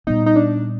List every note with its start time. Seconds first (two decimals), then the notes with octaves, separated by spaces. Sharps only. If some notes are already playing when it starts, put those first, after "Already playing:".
0.07 A#2 G3 B3 D#4
0.26 D#4
0.36 D4